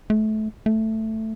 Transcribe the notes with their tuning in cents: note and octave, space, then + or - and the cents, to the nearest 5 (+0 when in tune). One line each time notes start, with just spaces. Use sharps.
A3 -25
A3 +5